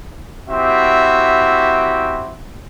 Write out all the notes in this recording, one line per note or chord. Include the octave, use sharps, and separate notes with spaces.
C4 E4 F#4 G4 E5